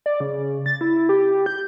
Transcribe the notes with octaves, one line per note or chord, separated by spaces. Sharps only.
D5
C#3
A6
E4
G4
G6